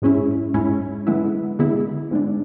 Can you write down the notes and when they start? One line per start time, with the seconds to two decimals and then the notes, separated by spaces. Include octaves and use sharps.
0.02 G#2 G#3 C#4 E4
0.54 G#2 G#3 C#4 E4
1.07 D3 G#3 B3 E4
1.59 D3 G#3 B3 E4
2.11 G#2 G#3 D4